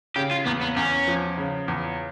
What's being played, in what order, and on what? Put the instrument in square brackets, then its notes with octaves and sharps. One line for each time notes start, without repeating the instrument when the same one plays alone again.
[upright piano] C#3 [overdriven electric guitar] G4
[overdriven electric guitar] F4
[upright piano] E2 [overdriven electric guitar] B3
[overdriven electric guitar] B3
[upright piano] E2 [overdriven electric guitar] C#4
[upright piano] F3
C#3
E2